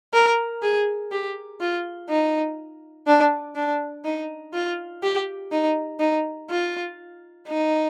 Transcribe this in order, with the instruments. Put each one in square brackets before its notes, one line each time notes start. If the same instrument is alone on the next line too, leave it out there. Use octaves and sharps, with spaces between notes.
[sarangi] A#4
G#4
G4
F4
D#4
D4
D4
D#4
F4
G4
D#4
D#4
F4
D#4